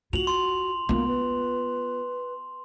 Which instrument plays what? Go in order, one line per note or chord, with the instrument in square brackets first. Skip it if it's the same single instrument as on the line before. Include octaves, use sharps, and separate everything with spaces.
[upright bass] F4 [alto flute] F#4 [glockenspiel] F7 F#7
[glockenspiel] C6
[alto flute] A#3 [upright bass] B3 F4
[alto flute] B4